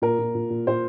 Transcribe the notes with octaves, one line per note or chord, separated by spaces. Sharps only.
A#2 A#4
A#2
A#2
A#2
A#2 C5